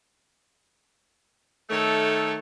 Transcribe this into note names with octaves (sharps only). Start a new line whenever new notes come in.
D#3 A3 A4 C#5